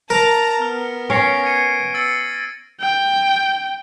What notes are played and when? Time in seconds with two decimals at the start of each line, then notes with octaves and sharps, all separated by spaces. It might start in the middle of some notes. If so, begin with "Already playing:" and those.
0.10 A#4 A5 A#5
0.62 B3 F6
1.10 C#4 C#5 A#6 C7 D7
1.44 G#6 C#7 D#7
1.94 E6 A6 C#7
2.80 G5